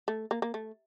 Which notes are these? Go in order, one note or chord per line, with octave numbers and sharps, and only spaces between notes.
A3
A#3
A#3
A3